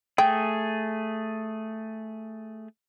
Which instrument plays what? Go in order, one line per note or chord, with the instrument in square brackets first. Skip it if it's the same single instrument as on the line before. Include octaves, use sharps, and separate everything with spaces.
[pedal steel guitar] A3 G#4 [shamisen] G5